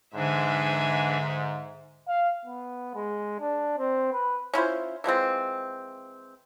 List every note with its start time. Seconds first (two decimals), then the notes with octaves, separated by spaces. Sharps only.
0.15 G#2 D3 E3 D4 E5 G#5
2.08 F5
2.45 B3
2.95 G#3
3.40 D4
3.78 C4
4.13 B4
4.54 C#4 E4 F4 C5
5.04 E3 F3 G#3 C4